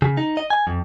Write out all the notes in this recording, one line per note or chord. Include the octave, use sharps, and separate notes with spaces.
C#3
D#4
D#5
G#5
F2